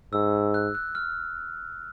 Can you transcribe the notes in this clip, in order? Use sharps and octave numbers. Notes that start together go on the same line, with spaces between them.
G#2 E6
F#6
F#6
F6